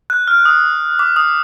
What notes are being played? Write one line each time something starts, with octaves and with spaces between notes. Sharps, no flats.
F#6
F6
D#6
D6
D#6